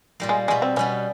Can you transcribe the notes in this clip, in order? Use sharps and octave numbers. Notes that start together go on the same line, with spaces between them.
A#2 G3 A#3
G#3
B2 G3 G#3 B3
C4
B2 G3 B3 C#4